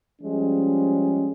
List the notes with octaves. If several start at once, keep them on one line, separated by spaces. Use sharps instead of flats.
F3 G3 G#3 C#4